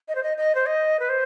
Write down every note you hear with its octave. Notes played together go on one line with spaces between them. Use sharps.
D#5
C5
D#5
D#5
C5
D#5
B4
C5